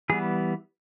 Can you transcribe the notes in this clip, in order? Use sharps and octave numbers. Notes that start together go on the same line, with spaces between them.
E3 G3 B3 G#4